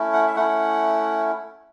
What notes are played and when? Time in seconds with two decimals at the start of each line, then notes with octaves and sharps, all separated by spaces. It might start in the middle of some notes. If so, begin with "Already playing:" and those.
Already playing: A3 C#4 E4
0.13 F#5
0.28 E5
0.36 A3 C#4 E4 F#5